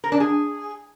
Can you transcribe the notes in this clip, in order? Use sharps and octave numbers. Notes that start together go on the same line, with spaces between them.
A#4
D4
G#4